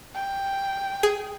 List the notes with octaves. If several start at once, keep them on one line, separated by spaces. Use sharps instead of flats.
G5
G#4